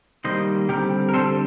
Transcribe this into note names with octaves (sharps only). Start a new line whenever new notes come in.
D#3 G3 A#3 C5 D#5
D3 G3 C4 G4 A#4
A#4
D3 G3 C4 A4 C5